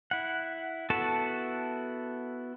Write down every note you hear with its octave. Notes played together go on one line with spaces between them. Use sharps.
E4 F#5
B3 E4 F#4 A4 A5